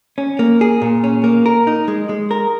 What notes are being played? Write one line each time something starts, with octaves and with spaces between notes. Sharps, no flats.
C#4
A#3
G#4
A#2
C#4
A#3
A#4
D#4
G#3
G#3
A#4